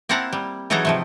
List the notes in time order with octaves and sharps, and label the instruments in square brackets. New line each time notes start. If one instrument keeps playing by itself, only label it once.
[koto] A#3 C4 E4 F#5 A5 A#5
G3
E3 F#3 D#4 G#4 A4 A#5
C3 F3 A3